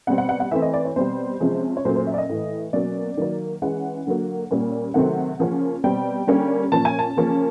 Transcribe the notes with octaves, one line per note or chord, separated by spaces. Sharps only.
B2 G3 C4 F#5
F#5
F#5
F#5
E3 A3 C4 E5
D#5
D5
C#5
B2 G3 C4 C5
C3 F3 G#3 C#4
C#5
A#2 F#3 A3 C#4 C5
C5
E5
D5
D#5
A2 E3 A3
B2 F#3 A#3 C#4 D5
D#3 F#3 A#3
E3 G#3 C#4 F#5
D3 F#3 A#3
A#2 G3 A#3 C#4
C3 D#3 F#3 A3 C4 F#5
C#3 F3 A#3 C#4
B2 G3 C4 G5
D3 G3 A#3 C#4
A#2 F3 A#3 C#4 A5
G#5
A5
C#3 F3 A#3 C#4